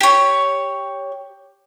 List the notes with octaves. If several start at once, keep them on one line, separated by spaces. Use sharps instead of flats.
G4 C#5